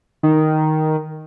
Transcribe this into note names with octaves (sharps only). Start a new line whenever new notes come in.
D#3